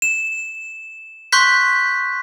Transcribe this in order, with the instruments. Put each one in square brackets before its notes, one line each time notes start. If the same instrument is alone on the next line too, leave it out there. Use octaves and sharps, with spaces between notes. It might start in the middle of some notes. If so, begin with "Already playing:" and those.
[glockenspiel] E7
C6 C#6 F#6 G6 B6